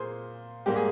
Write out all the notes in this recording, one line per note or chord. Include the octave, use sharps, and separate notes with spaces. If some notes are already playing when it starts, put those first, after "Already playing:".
Already playing: A#2 G#4 A#4 C5
G#2 G3 A#3 G4
G#4